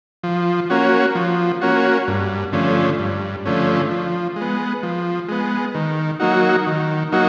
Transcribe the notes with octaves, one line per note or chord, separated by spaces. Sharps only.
F3
A#3 C#4 F#4
F3
A#3 C#4 F#4
G2
D3 F3 A3 C#4
G2
D3 F3 A3 C#4
F3
G#3
B3
F3
G#3 B3
D#3
F#3 A#3 D#4 F#4
D#3
F#3 A#3 D#4 F#4